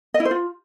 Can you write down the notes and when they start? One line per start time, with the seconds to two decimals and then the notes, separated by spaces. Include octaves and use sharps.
0.14 D#5
0.20 E4
0.25 C5
0.31 F4